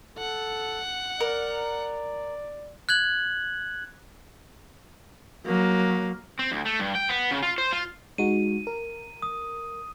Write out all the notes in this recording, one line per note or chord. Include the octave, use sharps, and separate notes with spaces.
A4 F#5
A#4 D5
F#6 G#6 F#7
F#3 A#3
C4
D2
A3
G2
G5
B3
C#3
F4
C5
F4
G#3 D#4 F#4 D#7
A#4
D#6